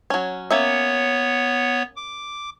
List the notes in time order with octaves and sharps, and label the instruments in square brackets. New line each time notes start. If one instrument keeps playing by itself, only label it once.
[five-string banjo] F#3 C#4
[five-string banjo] A#3 C#4 E5 [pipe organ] B3 C#5
[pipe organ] D6